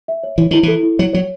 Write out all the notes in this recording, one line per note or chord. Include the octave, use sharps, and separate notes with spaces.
E5
C#5
E3 C#5
D#3 E4
E3 A4
E4
F#3 C#5
F#3 C#5